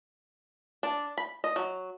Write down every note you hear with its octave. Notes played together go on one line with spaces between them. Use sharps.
D4
B5
D#5
F#3